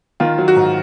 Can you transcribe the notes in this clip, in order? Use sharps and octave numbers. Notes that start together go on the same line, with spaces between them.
D#3 F4
F#3
F#4
G#2